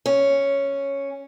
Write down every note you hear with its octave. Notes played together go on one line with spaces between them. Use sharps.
C#4